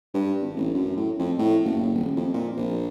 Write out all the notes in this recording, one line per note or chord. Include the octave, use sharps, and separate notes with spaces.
G2
G#1
A1
F#2
A2
F2
A2
F#1
D#1
F2
A#2
A#1